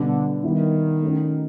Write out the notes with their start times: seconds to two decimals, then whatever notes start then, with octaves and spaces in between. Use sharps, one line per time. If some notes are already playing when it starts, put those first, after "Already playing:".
Already playing: B2 D3 G3 B3 D4
0.44 D#3 G3 B3 E4
1.02 A3 C#4 F#4